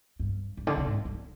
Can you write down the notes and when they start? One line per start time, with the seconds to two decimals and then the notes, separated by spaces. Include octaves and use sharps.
0.20 G2
0.57 G2
0.67 D3
0.77 C3
0.86 G#2
1.05 G2